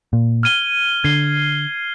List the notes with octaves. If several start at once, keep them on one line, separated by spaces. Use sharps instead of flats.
A#2
F6 G#6 D#7 G7
D3 G#6 C7 D#7 G7